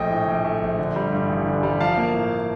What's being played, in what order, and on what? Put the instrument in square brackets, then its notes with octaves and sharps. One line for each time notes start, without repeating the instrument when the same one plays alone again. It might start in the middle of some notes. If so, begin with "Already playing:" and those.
Already playing: [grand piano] A#1 A3 D#5 G5
A2
A#1
A3
A#1
D3
G3
G2
A1
D3
G3
F3 F5 A5
A#3
A2